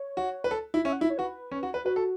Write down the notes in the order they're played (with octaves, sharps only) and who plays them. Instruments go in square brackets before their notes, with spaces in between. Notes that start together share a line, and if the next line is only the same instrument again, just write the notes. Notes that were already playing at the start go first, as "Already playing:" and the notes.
Already playing: [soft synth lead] C#5
[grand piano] F#4
B4
A4
E4
[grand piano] C#4 [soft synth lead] E5
[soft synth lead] F#5
[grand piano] E4 [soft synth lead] E5
[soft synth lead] C#5
[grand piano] F#4 [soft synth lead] B4
[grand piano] C#4
F#4
B4
[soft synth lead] F#4 [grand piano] B4
[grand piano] A4